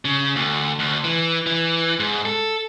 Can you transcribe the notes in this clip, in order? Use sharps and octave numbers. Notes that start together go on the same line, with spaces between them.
C#3
D2
D2
E3
E3
G#2
A4